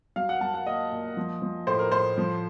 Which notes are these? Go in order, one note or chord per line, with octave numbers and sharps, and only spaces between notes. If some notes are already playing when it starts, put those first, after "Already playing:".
F#3 F5
F#5
F#3 A5
F#5
A#2 D#5
A#2
F3
F3
A2 C5
A#4
A2 C5
F3